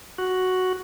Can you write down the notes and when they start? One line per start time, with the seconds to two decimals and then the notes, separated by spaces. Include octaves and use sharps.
0.18 F#4